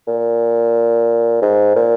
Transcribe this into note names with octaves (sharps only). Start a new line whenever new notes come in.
A#2
G#2
A#2